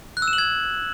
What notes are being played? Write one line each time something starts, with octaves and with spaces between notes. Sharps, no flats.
F#6
E6
E7
F#7
G#6